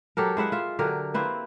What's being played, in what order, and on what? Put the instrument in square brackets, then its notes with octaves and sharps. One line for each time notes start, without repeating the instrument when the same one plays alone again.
[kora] F#3 G4 A4 A#4
G#3 E4 E5 F#5
F4 E5
D3 F#3 G4 A#4
A#3 C4 E4 B4